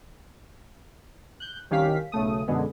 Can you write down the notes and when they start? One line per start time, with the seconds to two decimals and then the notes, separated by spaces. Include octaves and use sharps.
1.40 F#6 G6
1.70 C2 D#3 C#4 G4 F5 B6
2.12 B1 C#3 A3 D#6
2.48 F#2 B2 D3 G#3 B3